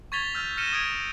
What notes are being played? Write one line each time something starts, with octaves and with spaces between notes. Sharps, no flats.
C#6 G#6 A6 B6 F7 G7
E6 F6 G6
F6 A#6 C#7 D#7 E7 G7
D#6 G#6 D7 F7